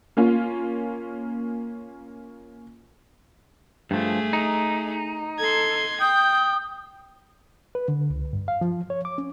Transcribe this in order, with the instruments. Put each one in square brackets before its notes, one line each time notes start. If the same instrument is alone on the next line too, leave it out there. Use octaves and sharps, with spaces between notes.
[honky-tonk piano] A#3 C#4 F4
[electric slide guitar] G2 F3 [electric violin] A3 G#4
[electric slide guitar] D#4 [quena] A#5
[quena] A4 [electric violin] C6 G#6
[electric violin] G5 [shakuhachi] D#6 [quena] G6
[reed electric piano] B4
D3
C#2
G2
F5
F3
C#5
D6
C#4